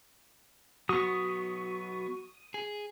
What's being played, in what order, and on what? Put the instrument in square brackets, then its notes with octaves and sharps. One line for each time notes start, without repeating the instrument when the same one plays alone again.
[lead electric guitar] F#3 B3 [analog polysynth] F#4 C#6 [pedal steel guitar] D#6
[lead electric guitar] G#4